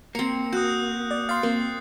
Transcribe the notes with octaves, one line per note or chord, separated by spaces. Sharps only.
A#3 C4 A#5 C#7
F#4 D#6 F#6 G6
D5
F5 C6 A6 C7
A#3 C4